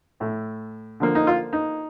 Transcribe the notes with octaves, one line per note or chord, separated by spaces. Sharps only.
A2 A3
D3 F3 A#3
D#4
F4
D#4